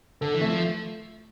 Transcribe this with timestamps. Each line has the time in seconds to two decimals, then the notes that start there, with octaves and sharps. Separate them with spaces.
0.21 D3 A4
0.34 E3
0.41 A3
0.49 F3